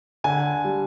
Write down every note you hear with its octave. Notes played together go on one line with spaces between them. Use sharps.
D3 G#5
G3